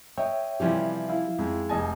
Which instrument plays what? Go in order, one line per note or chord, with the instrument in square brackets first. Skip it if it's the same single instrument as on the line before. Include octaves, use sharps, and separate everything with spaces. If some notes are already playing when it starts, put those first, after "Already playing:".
[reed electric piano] C#5 E5 G5 [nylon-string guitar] D#5
[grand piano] C3 E3 G3 [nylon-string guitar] F3 C#4 G4
[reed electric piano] E4 F5
[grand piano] F2 [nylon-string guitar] G#3
[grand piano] F1 D#5 G#5 [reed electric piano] A5